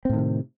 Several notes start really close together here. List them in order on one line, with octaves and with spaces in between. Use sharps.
C4 A2 D#3 C3